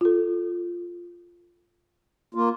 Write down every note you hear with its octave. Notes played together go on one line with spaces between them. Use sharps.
F4 A4
A#3 F4